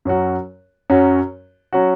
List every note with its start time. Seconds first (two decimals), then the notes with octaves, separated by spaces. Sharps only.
0.05 F#2 F#3 C#4 F#4
0.90 F#2 F#3 C#4 F#4
1.73 F#3 C#4 F#4